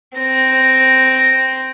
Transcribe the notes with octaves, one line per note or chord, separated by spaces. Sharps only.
C4 A#6